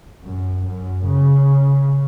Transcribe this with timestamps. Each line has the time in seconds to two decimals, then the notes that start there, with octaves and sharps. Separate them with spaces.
0.24 F#2
0.66 F#2
1.06 C#3